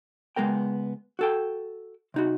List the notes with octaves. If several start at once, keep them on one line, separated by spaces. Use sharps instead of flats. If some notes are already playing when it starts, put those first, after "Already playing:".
C#2 G#3 B3 A#4 G5
F#4 A4 G5
C3 D#4 F#4